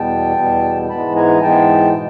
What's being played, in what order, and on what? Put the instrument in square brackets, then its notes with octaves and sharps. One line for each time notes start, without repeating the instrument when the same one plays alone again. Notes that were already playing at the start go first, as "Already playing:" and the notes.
Already playing: [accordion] E2 B2 G3 B3 G5 A5
E2 B2 G3 B3
G#2 E3 G#3 B3 A5 B5
G#5 A#5
G#2 E3 G#3 B3 G5 A5
B2